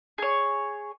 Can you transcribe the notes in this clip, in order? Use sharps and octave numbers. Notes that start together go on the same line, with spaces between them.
G#4 C#5